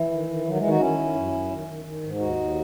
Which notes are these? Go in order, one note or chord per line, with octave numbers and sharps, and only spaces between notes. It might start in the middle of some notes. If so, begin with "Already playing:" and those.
Already playing: E3
D#3
D#3
D#3 F#3
E3 G#3
D#3
D#4 F#4
D#3 C#4 E4
D#3
F#2
F#2
D#3
D#3
D#3
G#2
D#2 D#4 F#4
D#2